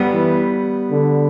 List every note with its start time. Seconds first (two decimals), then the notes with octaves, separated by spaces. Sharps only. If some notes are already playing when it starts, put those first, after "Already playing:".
Already playing: G3 B3
0.13 E3
0.91 D3